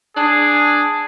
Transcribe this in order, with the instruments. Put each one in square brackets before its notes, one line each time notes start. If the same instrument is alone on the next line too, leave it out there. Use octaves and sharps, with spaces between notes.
[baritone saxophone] D4 [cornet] G#4